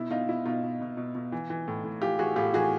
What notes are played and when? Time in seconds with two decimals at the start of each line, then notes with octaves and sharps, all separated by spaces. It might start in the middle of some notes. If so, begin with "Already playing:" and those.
Already playing: B2 E4
0.10 B2 D#4 F4
0.29 B2 E4
0.45 B2 D#4 F4
0.63 B2
0.81 B2
0.97 B2
1.15 B2
1.32 E3
1.50 E3
1.68 A2
1.85 A2
2.01 E3 F4 G4
2.19 E3 F#4 G#4
2.36 A2 F4 G4
2.54 E3 F#4 G#4